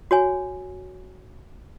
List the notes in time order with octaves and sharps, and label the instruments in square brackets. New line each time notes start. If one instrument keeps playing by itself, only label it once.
[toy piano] F#4 C#5 G#5